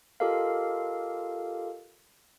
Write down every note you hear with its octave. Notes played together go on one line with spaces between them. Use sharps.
F4 G4 A4 A#4 D#5 F5